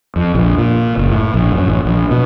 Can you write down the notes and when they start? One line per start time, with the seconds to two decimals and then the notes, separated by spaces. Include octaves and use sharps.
0.16 F2
0.34 A#1
0.58 A#2
0.97 F#1
1.11 A2
1.34 A#1
1.52 F#2
1.68 A1
1.85 A#1
2.11 B2